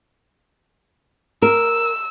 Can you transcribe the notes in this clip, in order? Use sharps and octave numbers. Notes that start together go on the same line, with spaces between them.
A#4 E6